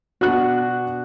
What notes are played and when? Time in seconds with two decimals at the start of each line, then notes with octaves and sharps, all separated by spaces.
0.21 B2 D4 F#4 F#6